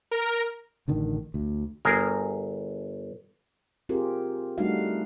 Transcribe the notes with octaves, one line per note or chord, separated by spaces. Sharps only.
A#4
A1 D3 D#3
D2
G1 G#4 A#4
C4 F4 G4 G#4 A#4
G3 A3 D4 D#4 F#4 F5